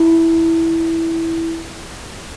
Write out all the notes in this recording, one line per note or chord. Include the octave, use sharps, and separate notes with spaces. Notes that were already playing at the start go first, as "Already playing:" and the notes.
Already playing: E4